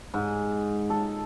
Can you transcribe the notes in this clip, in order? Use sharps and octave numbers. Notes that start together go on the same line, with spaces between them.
G#2
A4